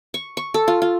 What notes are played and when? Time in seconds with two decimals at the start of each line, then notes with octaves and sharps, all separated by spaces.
0.14 C#6
0.37 C#6
0.54 A4
0.68 F4
0.82 F4